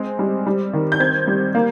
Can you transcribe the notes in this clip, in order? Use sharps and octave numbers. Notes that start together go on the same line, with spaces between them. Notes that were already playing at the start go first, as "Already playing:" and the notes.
Already playing: G#3 C4
G3
G3
D#3
G6
C4 G#6
G3
A#3